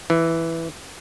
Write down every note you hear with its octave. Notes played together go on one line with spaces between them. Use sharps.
E3